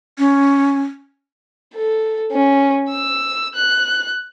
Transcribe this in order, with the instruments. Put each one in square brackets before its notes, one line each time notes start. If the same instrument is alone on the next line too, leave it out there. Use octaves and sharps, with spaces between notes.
[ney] C#4
[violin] A4
C#4
E6
F#6